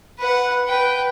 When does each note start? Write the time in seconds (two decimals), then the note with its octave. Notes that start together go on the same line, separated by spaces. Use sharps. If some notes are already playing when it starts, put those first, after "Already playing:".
0.18 B4 F#5
0.68 B4 G5